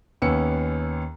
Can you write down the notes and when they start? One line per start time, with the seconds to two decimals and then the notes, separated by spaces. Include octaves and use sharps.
0.22 D#2 B3 C#4 E6 C#7